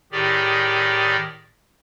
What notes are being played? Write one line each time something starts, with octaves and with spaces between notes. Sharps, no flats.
A2 D#3 G4 G#4 D5